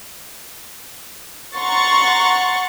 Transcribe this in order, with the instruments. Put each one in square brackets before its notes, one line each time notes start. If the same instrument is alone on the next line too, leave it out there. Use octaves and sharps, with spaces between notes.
[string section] F#5 A#5 C6 C#6 A6